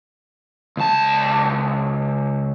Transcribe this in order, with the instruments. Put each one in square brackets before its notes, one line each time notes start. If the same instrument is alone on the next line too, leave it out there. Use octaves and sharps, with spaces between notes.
[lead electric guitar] C#2 A5